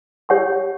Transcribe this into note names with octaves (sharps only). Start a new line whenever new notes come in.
G4 C#5 F#5 C#6